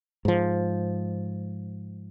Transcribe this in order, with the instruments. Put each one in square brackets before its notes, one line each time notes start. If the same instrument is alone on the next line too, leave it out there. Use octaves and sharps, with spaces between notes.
[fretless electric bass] G#2 F3